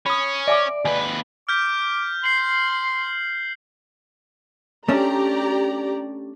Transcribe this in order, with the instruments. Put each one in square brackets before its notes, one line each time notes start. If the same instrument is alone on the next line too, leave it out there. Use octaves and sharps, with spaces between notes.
[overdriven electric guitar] C#4 [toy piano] B5 D#6
[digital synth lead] D5 [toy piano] E5 G#5 D6
[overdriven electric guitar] D#2 B4 [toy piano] G#5
[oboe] D6 [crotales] F6 G6 B6
[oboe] C6 [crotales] C7 F#7
[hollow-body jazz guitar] A3 C#4 D4 [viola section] G4 D5 A#5